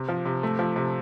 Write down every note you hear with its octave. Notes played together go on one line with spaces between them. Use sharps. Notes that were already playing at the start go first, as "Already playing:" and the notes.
Already playing: C3
F3
C3
A3
F3
C3